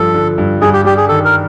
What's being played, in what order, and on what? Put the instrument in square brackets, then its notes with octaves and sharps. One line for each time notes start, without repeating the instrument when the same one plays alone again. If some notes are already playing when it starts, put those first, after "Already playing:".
Already playing: [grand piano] G2 F3 [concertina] A4
[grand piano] D3
G2
[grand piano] G2 [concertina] G#4
[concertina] G4
[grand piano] G3 [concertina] G4
[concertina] G#4
[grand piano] D#3 [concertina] A4
[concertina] A#4